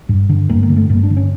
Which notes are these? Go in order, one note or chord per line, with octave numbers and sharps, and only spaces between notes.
G2
D3
G2 A#3
A#3
D3
A3
G2 A#3
D4
D3
C#4